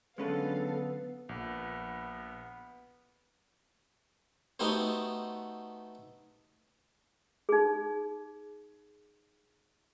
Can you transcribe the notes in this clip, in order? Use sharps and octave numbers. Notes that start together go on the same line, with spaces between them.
D3 F#3 G#3 B3 C#4 A4 B4 F5
A#1 B3
A3 B3 D#4 F#4 G4 C5
D#4 G#4